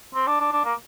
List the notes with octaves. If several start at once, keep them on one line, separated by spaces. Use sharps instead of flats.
C4
D4
D4
D4
A#3